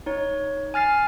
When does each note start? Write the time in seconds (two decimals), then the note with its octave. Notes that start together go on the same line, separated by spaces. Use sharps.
0.06 D#4 C#5
0.74 G#5 F6 A6 C7